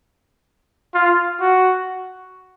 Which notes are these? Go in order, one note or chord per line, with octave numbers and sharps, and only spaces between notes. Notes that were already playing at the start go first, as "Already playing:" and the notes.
F4
F#4